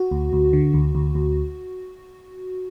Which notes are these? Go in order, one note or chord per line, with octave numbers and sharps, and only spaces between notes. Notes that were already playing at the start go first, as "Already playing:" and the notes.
Already playing: F#4
D2
D2
D3
D2
D2
D2